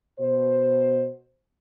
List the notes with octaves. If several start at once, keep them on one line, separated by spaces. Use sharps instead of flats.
B2 C5